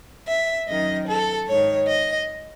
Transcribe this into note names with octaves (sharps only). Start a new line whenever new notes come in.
E5
F#2 D#3 D#5
A4
G#2 D#3 C#5
D#5